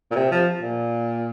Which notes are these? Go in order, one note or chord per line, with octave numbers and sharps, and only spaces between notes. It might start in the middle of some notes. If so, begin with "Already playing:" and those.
A#2
C3
F3
A#2